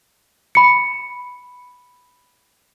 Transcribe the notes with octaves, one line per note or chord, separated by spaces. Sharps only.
B5 C#7